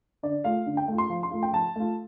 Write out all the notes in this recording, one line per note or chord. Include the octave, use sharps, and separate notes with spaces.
D3 D5
A3 F4 F5
D3
G5
A3 F4
C6
F3
C6
A3 F4
G5
F3 A5
A3 F4